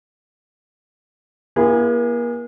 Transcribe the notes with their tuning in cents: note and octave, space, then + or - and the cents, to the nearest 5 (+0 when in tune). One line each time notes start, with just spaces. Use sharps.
A#3 +40 E4 +35 G#4 -15